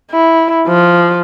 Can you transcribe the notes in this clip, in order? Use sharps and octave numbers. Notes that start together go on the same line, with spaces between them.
E4
F3